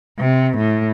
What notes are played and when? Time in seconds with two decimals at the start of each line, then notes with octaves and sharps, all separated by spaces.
0.19 C3
0.58 A2